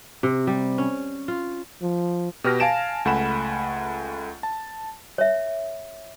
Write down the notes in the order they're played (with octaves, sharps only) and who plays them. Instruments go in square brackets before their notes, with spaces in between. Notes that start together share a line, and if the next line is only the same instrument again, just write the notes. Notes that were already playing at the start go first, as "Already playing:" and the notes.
[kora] C3
G3
C#4
F4
[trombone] F3
[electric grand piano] B2 G4 B4 F6 A#6
F5 G#5 A5 D7 E7
C#2 A3 F#5 G#5 B5 E7
A5
[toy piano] C#5 E5